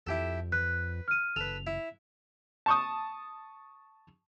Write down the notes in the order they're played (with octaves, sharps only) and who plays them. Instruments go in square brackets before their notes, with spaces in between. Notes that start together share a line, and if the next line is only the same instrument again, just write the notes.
[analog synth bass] F2 [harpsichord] E4 G4 A4
[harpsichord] B4 [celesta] F#6
[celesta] F6 D#7
[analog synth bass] F#1 [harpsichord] A4 B4 [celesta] F7
[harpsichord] E4
[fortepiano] A5 C#6 D#6